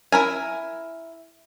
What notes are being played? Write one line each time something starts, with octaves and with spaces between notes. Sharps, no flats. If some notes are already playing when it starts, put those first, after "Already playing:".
E4 A#4 G#5